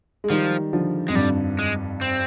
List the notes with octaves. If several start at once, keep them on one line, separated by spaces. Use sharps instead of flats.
G#3
D#3 F3 G3
D3 F3
F2 G#3
G2 G3
G#3
C4